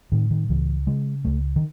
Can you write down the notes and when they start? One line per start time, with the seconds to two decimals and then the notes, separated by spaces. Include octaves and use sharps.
0.12 A2 D#3
0.31 D#3
0.49 C#2 E3
0.87 C#3 G#3
1.25 C#2 A3
1.56 D#3